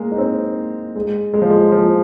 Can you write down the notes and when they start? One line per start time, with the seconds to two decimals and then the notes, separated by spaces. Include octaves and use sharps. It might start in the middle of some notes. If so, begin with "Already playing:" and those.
Already playing: G#3 A#3
0.12 D#4
0.18 C4
0.96 G#3
1.34 G#3
1.42 F3
1.50 G#3
1.72 F3